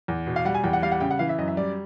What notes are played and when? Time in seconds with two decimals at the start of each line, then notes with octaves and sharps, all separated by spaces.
0.08 E2
0.27 B2
0.36 F5
0.45 G3 F#5
0.55 G#5
0.64 E2 G5
0.73 F#5
0.82 G3 F5
0.92 F#5
1.00 C#3 G5
1.11 F#5
1.19 E3 F5
1.29 E5
1.38 F#2 D#5
1.48 E5
1.57 G3 D5